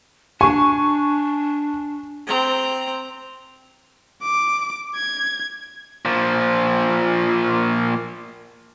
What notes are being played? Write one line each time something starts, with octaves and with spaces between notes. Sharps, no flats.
D4 G#5 C#6
C4 A#5
D6
G#6
A#2 F3